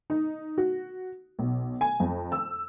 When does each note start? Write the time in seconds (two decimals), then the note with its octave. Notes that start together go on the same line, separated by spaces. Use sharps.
0.10 D#4
0.58 F#4
1.39 B1
1.81 G#5
2.00 F2
2.32 E6